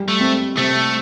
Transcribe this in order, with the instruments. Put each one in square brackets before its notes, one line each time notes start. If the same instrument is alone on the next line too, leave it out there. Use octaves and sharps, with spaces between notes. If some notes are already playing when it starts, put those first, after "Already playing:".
Already playing: [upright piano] G3
[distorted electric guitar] A3
[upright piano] C4
[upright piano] C3 [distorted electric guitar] A3